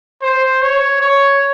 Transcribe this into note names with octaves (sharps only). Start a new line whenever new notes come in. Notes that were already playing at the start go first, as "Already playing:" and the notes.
C5
C#5
C#5